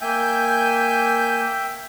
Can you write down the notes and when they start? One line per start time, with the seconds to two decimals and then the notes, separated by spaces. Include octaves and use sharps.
0.01 A#3 E5 G5 G#5 G6